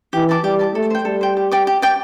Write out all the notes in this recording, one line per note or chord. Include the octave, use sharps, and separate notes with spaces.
E3 G4
D5 A5 D6
G3 G4
D5 A5 D6
A3 A4
C5 G5
G3 A4
C5 G5
G4
D5 G5 D6
G4
D5 G5 D6